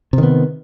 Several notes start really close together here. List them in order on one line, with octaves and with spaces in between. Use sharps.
C3 D#3 B3